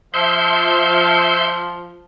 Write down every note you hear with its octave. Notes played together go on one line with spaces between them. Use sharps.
F3 E5 C6 G6